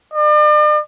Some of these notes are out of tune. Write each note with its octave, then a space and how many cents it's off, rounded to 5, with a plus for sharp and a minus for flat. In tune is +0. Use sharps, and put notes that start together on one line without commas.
D5 +45